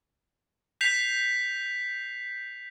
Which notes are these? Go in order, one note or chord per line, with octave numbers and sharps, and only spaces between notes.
G6 B6 C7 F7